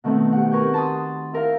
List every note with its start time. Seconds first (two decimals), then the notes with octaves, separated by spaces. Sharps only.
0.04 B2 D#3 A3 B3 C4
0.33 G4 F#5
0.51 A#4 B4 G#5 C#6 F#6 G6
0.74 A5 B5 C6 D#6
1.33 E4 A#4 C5 F5